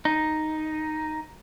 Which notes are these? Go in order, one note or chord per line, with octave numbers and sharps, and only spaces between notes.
D#4